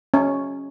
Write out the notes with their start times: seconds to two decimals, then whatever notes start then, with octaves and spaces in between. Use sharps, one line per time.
0.14 C#4